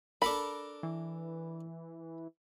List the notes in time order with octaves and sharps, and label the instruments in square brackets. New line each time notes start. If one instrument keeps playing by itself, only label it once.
[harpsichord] D4 A4 A#4 [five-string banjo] B5
[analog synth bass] E3